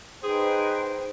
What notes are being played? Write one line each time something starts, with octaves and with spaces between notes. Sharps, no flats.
D#4 G#4 B4 C5 G5